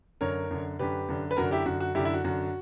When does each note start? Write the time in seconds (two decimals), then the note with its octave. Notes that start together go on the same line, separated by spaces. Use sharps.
0.21 F#2 D3 A#4 C#5
0.51 F#2 D3
0.79 F#2 D3 G4 B4
1.09 F#2 D3
1.31 B4
1.37 F#2 D3 F#4 A#4
1.51 E4 G4
1.66 F#2 D3 F#4
1.80 F#4
1.95 F#2 E4 G4
1.99 D3
2.05 E4
2.14 F#4
2.24 F#2 D3 F#4